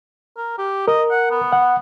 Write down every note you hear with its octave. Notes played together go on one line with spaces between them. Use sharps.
A#4
G4
A#4 D#5
F#5
B3
F#5